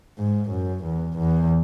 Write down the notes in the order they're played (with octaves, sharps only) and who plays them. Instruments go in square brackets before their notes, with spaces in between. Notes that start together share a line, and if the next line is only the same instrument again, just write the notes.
[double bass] G#2
F#2
E2
E2